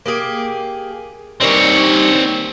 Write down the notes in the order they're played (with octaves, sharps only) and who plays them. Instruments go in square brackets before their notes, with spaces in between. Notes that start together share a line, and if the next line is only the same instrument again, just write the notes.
[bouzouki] A#3 G4 G#4
[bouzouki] D#3 G3 D#4 [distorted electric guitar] C4 C#5